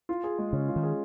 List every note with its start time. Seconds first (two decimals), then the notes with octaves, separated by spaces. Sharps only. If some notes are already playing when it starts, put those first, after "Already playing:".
0.09 F4
0.24 G#4
0.39 G#3
0.53 C#3 C#4
0.68 F4
0.76 D#3
0.83 G#4